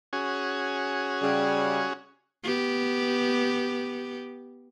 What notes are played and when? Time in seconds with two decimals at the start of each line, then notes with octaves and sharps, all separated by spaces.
0.13 C#4 F#4 G#4
1.22 C#3 G3
2.44 B3 G4